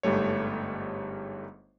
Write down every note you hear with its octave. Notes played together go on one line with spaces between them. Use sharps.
G1 G#2 G3 A3 C#5